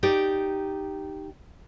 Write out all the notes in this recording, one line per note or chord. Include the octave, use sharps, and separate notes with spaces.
D#4 G4 D5